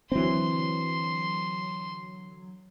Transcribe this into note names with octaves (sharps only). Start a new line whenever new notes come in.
D3 E3 F#3 C4 C6